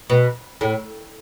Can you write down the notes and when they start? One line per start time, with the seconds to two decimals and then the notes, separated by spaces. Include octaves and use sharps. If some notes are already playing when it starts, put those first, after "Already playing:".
0.10 B2
0.61 A2